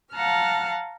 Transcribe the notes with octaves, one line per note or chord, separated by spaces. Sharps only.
F5 F#5 A5 A#5 F6 F#6